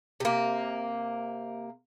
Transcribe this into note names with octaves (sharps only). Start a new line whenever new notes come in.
C3 A#3